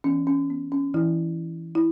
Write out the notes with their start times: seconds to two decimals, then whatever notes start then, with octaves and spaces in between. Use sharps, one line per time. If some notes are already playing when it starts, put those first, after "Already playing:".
0.04 E3 B3 C#4
0.27 C#4
0.50 B3
0.72 C#4
0.94 E3 E4
1.75 E4